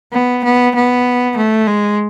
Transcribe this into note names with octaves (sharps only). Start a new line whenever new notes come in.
B3
B3
B3
A3
G#3